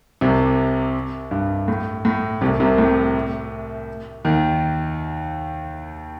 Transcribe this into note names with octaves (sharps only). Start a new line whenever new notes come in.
C2 C3
G2
A2
A2
C2 C3
C2 C3
A2
D#2 D#3